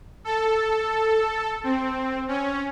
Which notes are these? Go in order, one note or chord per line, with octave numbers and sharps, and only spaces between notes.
A4
C4
C#4